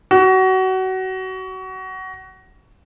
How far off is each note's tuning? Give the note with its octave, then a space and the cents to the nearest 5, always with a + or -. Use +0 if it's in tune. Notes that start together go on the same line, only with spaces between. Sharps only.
F#4 +25